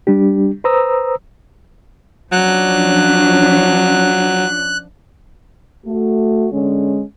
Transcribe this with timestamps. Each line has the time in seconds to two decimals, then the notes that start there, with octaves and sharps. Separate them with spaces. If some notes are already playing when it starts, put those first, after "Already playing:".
0.07 G3 D4 G4
0.64 B4 C5 A#5 D#6 E6
2.32 F3 F#3 C#4 D4 F#6
5.86 A3 F#4
6.51 D3 G#3 C#4